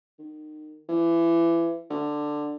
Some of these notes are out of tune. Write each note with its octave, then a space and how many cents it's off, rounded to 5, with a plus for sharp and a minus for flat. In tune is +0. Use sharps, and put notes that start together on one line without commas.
D#3 -25
E3 +25
D3 +10